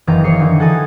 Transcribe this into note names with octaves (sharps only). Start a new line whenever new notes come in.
F#1 D#3 E3 B3 F5 A#5
C#5 D#5 F5 C#6 C7
D3 E3 D#4
F#4 A4 G#5 A5 D#6